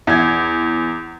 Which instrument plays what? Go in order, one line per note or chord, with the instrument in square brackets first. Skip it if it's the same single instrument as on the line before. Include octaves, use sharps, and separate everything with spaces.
[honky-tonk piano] E2 G#6